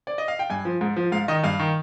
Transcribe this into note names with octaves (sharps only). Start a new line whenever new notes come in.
D5
D#5
F5
G5
G2 G#5
F3
G#2
F3
G#2 F5
D#3 D#5
G2 F5
D#3